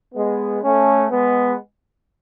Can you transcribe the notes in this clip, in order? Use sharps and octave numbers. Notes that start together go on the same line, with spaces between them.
G#3 B3
A3 C#4
G#3 B3